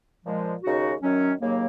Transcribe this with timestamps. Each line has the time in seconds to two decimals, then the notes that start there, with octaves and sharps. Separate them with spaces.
0.25 A#2 F3 G#3
0.63 D#2 C#3 G#3 D#4 F#4
1.02 F#2 D#3 F#3 C#4
1.40 D#2 C#3 F#3 A#3